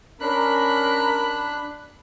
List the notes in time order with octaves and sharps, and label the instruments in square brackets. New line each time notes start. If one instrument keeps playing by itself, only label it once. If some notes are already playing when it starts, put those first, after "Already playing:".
[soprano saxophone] C#4 [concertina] D4 F#6 [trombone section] A#4 [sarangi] B5